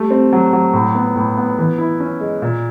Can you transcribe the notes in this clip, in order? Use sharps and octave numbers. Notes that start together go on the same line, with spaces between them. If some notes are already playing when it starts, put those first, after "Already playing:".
Already playing: G3 A3
C4
F#3
F#3
A2
B3
A2
B3
E3
E4
C#4
G#3
A#2